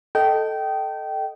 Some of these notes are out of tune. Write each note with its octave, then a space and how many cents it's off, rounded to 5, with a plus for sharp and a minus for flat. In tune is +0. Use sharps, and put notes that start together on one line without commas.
A4 +0 D#5 +0 G5 -20